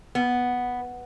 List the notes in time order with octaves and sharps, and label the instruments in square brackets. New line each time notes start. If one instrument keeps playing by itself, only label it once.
[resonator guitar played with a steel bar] B3